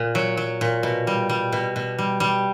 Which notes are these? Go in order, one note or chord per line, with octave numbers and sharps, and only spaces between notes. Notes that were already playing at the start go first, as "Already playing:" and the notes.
Already playing: A#2
F#3
F#3
A#2
B2
G3
G3
B2
B2
G3
G3